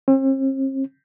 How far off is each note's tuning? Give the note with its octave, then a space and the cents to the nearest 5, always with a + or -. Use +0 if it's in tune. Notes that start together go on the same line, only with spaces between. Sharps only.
C4 +45